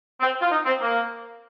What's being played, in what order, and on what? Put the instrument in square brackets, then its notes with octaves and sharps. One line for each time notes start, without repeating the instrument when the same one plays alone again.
[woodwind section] C4
F4
D#4
C4
A#3